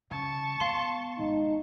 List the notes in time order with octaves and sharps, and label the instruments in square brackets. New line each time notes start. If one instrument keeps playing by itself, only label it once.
[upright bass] C#3 [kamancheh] A5 C#6
[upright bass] B3 [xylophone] F5 C6
[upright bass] G#1 [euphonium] D#4